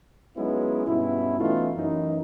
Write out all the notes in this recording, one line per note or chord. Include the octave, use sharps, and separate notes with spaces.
F#3 G#3 B3 C#4 D#4 E4
G2 B2 C#4 E4
E3 A3 B3 C#4 D#4 F4
F#2 E3 D#4